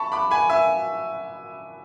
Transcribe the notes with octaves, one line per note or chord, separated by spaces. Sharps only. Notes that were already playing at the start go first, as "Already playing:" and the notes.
Already playing: A5 B5 C#6
B5 D6
G#5 B5
E5 G#5